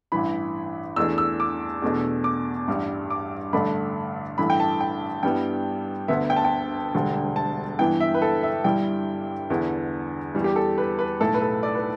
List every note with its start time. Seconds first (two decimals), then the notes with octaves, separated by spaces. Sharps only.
0.12 A1 G2 E3 B5
0.96 E2 E3 A3 D4 E6
1.18 E6
1.40 D6
1.82 E2 B2 A3 D4
2.24 D6
2.67 A1 G2 G3
3.10 D6
3.52 A1 G2 D3 A3 D4 B5
4.38 A1 G2 E3 A3 B5
4.50 G5
4.60 A5
4.81 G5
5.23 G2 G3 B3 E4 G5
6.08 D2 D3 B3 E5
6.30 G5
6.36 A5
6.44 G5
6.94 E1 D2 D3 G3
7.36 A5
7.79 G2 E3 B3 E4 G5
8.00 E5
8.15 B4
8.22 A4
8.43 E5
8.64 G1 G2 G3 E4 G5
9.50 E2 D3 B3 E4
10.35 E2 E3 G3
10.44 G4
10.56 A4
10.78 B4
10.99 B4
11.20 B1 A2 A3 E4 A4
11.34 B4
11.42 A4
11.63 D5
11.75 B4